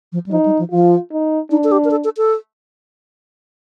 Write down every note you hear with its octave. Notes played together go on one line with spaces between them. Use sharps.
F3
G3
F3 D#4
G3
F3
F3 F4
D#4
D4 D#4
A4
G4
A#4
A4
A4
A4